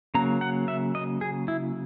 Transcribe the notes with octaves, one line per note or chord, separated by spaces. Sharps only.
C#3 F#3 A#3 A#5
F#5
E5
D#5
G#4
E4